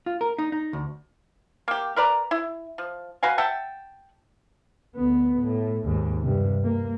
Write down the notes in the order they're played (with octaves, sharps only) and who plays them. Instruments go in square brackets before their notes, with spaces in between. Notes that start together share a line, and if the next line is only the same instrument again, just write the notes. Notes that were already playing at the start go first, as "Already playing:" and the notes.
[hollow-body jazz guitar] F4
A#4
D#4
D#4
D2
[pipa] A#3 G4
A#4 B4 D5 A#5
E4
F3
F#4 B4 F5 G#5
E5 F#5 G5 A5
[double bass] D2 B3
A2
D#2 G#2
G2 C3
A#3